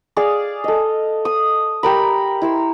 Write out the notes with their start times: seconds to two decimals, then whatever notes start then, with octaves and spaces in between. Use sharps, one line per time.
0.17 G#4 D5 F5
0.64 A4 D#5
1.25 D#6
1.83 G4 A#4 B5
2.42 E4 C6 E6